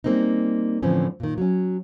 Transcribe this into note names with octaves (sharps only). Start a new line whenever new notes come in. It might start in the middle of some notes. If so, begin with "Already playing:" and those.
G3 A#3 C4 C#4 D#4
A2 D3 E3 F3 C4 C#4
A#2 D#3
F#3 C#4